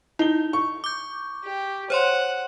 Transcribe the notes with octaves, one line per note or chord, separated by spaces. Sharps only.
D#4 E4 G7
C#6
D6 G6
G4
C5 C#5 F#5 C6